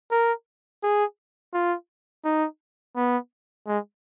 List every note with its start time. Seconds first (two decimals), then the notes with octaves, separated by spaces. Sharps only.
0.11 A#4
0.83 G#4
1.53 F4
2.25 D#4
2.96 B3
3.67 G#3